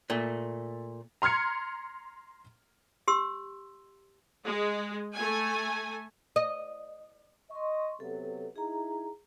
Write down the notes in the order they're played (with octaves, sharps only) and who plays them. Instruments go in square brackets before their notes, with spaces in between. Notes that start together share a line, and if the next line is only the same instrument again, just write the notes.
[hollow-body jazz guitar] A#2 A3
[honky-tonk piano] A#5 C6 F6 G#6 C#7
[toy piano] G4 C6 E6
[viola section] G#3
A3 G#5
[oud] D#5
[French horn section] D#5 [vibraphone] C6 C#6
[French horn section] C3 F#3 B3 [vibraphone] A4
[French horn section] D#4 E4 [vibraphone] G#4 A#5